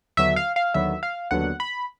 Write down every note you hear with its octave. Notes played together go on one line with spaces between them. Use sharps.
D#2 D3 F#3 B3 E5
F5
F5
D#2 D3 F#3 B3 E5
F5
D#2 D3 F#3 B3 F#5
B5